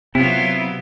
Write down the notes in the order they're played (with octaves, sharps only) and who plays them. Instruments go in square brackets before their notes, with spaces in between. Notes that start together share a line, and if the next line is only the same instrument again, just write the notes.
[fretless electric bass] C3 [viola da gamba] F#3 B3 F4 [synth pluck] C4 [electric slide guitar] E4